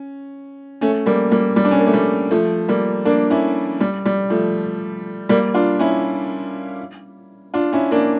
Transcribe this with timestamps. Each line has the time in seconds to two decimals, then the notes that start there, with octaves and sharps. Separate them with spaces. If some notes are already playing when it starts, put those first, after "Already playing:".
Already playing: C#4
0.81 A3 C#4
1.06 G3 A#3
1.31 G3 A#3
1.56 G3
1.65 D4
1.71 C#4
1.79 A#3
1.86 A3
1.93 G3
2.31 F3 A3
2.68 G3 A#3
3.05 A#3 D4
3.30 C#4 E4
3.80 G3
4.05 G3
4.30 F3 A3
5.29 G3 A#3
5.54 D4 F4
5.79 C#4 E4
7.54 D4 F4
7.73 C#4 E4
7.91 A#3 D4